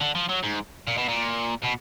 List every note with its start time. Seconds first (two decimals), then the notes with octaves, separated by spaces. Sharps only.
0.01 D3
0.15 F3
0.29 F#3
0.44 G#2
0.87 A#2
0.97 B2
1.08 A#2
1.64 B2